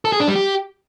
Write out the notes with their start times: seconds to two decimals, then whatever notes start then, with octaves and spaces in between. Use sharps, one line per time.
0.05 A4
0.12 G#4
0.20 D4
0.28 G3
0.35 G4